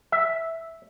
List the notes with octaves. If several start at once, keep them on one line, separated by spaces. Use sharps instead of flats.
E5